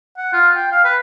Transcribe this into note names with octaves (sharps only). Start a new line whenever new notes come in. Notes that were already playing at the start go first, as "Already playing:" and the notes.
F#5
F4
G5
F5
B4